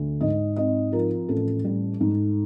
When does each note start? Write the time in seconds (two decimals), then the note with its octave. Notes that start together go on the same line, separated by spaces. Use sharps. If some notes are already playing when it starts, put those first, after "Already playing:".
Already playing: D2
0.21 G#2 D#5
0.56 C4 D#5
0.92 F3 A#4
1.29 A1 A4
1.65 G3
2.00 G#2